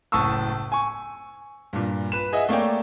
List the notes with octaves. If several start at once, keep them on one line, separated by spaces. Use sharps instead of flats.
F#1 A2 A5 C#6 D#6 E6
G#5 C#6
G2 A#2
B4 E7
G#4 D#5 E5 F#5
A3 A#3 C#5 D5 G5